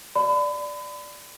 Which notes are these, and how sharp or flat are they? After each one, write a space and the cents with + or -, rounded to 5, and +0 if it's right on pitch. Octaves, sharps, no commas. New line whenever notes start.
D5 +0 B5 +35